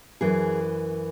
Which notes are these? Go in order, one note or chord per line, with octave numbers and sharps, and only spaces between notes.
F#2 E3 G#4